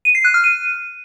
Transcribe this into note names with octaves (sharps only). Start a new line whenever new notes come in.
D#7
C7
F#6
F6
D#7